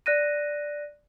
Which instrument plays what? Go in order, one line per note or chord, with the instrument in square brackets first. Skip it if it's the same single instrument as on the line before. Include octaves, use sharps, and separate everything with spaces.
[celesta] D5 F#6 A#6 D#7